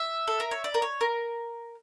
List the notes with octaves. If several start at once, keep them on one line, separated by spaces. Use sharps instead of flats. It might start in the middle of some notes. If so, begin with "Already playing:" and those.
Already playing: E5
A4
A#4
C#5
D5
A#4
C#5
A#4